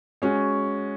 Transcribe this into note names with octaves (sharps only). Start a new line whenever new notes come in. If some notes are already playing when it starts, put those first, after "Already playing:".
G#3 C#4 F#4